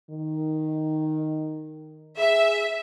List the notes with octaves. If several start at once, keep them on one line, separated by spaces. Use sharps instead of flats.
D#3
G#4 E5